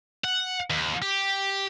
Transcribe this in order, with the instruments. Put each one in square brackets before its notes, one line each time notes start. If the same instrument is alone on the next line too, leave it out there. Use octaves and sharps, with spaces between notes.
[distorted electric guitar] F#5
D#2
G4